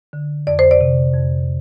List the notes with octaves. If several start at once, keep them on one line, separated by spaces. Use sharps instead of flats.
D3
F2 D5
C5
D5
C3
F2